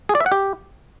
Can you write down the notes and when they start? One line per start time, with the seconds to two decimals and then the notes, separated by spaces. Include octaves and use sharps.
0.09 G#4
0.15 D5
0.20 E5
0.26 F#5
0.32 G4